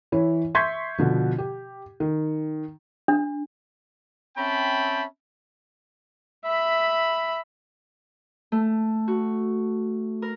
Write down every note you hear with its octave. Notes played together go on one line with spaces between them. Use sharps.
E3 E4 C#5
E5 C6 C#6 G6 G#6 B6
B2 D3 F3
G4
D#3
D4
C4 C#4 E5 G5 A5 B5
E5 B5
A3
F#4
A#4